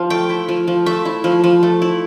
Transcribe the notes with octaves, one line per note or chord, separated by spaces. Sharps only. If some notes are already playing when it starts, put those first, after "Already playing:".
Already playing: F3 F5
A3 G5
E4
F3
F3
A3 E5
E4
F3
F3
A3
E4